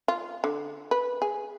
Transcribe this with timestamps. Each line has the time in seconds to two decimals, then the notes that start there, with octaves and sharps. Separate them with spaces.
0.08 F4
0.44 D3
0.91 B4
1.22 G#4